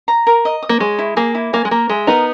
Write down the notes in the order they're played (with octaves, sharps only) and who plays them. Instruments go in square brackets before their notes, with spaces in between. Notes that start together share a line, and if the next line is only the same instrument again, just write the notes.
[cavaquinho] A#5
A#4
D#5
D#6
[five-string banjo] A#3
[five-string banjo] G#3 [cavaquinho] C#5
[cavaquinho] E4
[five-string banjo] A#3 [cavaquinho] G#4
[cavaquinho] E4
[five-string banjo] A#3 [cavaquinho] G#5
[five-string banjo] G#3
[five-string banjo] A#3 [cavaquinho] A#4
[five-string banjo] G#3 [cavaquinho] E5
[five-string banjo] B3 D#4 [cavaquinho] A#4